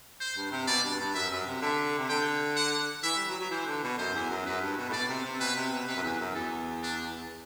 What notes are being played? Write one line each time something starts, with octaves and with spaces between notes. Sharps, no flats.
C5
G2
C3
B2 D5
G2
G2
F#2 E5
F#2
C3
D3 E5
C3
D3 G5
F#5
E3 E5
G3
F#3
F#3
E3 C5
D3
B2
F#2 C5
E2
F#2
F#2 B4
G2
B2
A2
B2 D5
C3
C3
B2 B4
C3
B2
C3 B4
F#2
E2
F#2
E2 A4
D4